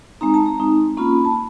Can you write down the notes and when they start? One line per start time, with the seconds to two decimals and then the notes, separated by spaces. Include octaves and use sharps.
0.21 G#3 C4 D#4 A#5
0.34 A5
0.46 A#5
0.60 G#3 C4 D#4
0.97 A#3 C#4 F4 B5
1.25 A5